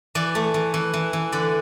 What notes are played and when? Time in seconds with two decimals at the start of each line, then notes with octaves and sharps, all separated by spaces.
0.15 E3 D5
0.35 A3
0.54 E3
0.74 E3
0.94 E3
1.13 E3
1.32 D3 D5